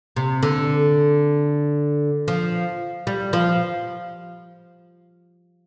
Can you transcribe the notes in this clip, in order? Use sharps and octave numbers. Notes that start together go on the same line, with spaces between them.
C3
D3
F3
G3
F3